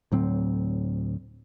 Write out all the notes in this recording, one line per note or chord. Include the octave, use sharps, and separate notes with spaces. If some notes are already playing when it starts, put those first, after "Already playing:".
D2 A2 F#3 C4